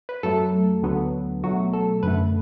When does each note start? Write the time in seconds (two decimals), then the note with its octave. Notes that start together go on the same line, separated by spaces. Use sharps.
0.09 B4
0.23 F#2 F#3 A3 A4
0.83 D2 D3 F#3 B3
1.43 B2 F#3 A3 F#4
1.73 A4
2.03 F#2 D3 A3 B4